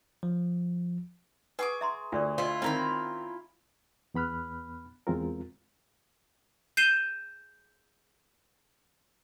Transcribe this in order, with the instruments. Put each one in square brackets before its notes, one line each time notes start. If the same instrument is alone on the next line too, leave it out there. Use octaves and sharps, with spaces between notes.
[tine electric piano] F3
[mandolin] G#4 C#6 D6 [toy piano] B4 F#5
[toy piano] E5 A#5 C6
[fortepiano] D2 [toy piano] F4 D5 E5
[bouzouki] E4 F4 [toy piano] C5 D#5
[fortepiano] D#3 C4 [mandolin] C#4 A#5 B5
[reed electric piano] E2 B3 B5 F6 F#6
E2 G#3 C4 F4 A#4
[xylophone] G6 C7 D#7 E7 G7